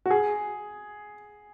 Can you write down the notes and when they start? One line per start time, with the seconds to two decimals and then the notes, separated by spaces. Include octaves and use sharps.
0.06 F#4
0.11 G#4